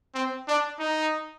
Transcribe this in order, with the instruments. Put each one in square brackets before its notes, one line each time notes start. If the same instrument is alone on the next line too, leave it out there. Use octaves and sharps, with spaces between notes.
[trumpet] C4
D4
D#4